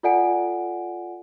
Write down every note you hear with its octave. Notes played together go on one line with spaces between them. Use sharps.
F4 A4 D5 F#5 G#5 D7